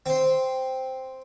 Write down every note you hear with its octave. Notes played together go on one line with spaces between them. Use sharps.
C4 C5